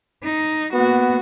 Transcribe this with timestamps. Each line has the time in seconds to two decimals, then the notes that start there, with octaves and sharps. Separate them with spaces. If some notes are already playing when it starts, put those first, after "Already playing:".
0.23 D#4
0.73 A#3 B3 F#4